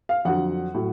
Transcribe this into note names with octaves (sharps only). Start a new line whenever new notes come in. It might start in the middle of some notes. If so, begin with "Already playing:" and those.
F5
F2 D3 F#3 F#5
A2 F#3